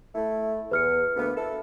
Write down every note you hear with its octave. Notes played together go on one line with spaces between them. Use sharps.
A3 E4
E2 B4 F6 C#7
D2 A#3 B3
E4 A4